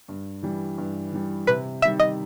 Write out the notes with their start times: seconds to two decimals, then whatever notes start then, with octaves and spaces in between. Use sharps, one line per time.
0.08 G2
0.43 E3 G3
0.78 G2
1.12 E3 G3
1.47 C3 B4
1.82 D#3 G3 E5
2.00 D#5